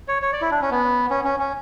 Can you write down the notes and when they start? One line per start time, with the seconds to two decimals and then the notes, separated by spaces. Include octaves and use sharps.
0.08 C#5
0.22 C#5
0.33 D5
0.41 E4
0.51 D4
0.62 C#4
0.71 B3
1.10 C#4
1.24 C#4
1.40 C#4